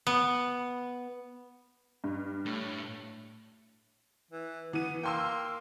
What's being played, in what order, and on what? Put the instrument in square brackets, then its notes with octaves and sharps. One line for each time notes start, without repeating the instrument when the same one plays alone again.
[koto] B3
[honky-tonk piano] G2
[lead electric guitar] A2
[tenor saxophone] E3
[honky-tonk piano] E3 D#7 [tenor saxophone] B3
[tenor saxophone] A#3 [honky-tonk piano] G5 C6 E6